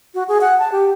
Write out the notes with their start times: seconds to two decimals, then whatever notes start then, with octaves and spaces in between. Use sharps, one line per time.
0.15 F#4
0.28 G#4
0.41 F#5
0.59 A5
0.72 G4